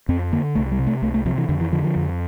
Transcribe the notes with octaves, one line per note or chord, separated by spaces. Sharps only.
F2 C4
D3 A#3
C2 A3
G3
C3
A3
C2 A3
A3
C3 F3
E3
F2 D3
E3
D3 F3
F3
F2